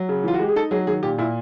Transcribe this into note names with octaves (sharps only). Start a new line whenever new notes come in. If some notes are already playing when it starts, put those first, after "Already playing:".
Already playing: F#3
C#3
E3 F4
F#4
G#3 G4
G#4
D#4 A4
F#3 G#4
D#3 G#4
A#2 G4
A#2 E4